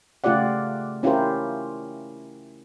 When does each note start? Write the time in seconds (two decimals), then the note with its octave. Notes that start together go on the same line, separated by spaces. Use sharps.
0.24 C#3 A3 F4 G4 D5 F#5
1.03 C#4 E4 F4 G4 A#4 C5